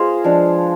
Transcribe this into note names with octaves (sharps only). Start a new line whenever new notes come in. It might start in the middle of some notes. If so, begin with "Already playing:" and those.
Already playing: B3 F4 G#4 C5 D#5 F5
F3 G#3 D4